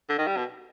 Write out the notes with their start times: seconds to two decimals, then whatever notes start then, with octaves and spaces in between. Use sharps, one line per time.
0.09 D3
0.18 D#3
0.27 G3
0.37 B2